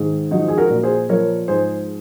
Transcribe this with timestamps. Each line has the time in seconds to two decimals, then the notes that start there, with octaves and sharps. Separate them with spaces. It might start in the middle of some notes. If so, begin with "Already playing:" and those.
Already playing: G#2 D#3
0.31 F3 D#4 F#4
0.48 G#4
0.57 F#4 A#4
0.70 A#2
0.83 G#4 C5
1.09 F3 A#4 C#5
1.48 G#2 G#4 C5